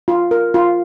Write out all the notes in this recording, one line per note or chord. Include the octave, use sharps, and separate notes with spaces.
F4
A#4
F4